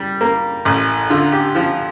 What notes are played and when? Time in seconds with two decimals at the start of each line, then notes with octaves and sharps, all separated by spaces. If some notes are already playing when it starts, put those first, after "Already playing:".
Already playing: G3
0.21 A#3
0.65 A1
1.10 D3 F4
1.32 G4
1.55 F3 F4